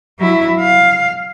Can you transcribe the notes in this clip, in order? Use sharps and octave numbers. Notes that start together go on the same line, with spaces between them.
F#3 E4
F5